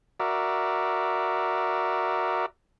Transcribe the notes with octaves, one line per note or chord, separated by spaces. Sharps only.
F#4 A#4 D5 E5